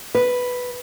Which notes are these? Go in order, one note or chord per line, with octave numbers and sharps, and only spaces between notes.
B4